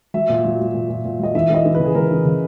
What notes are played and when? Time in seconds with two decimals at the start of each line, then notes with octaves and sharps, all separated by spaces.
0.14 F#3 E5
0.29 A#2
0.44 F#3
0.60 F#3
0.74 A#2
0.89 A#2
1.05 A#2
1.19 F#3 D#5
1.34 E3 E5
1.50 E3 D#5
1.65 E3
1.75 B4
1.80 C#3
1.85 G#4
1.95 C#3 A#4
2.11 E3
2.25 C#3